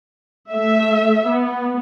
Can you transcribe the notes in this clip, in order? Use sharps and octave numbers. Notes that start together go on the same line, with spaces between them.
A3 E5
B3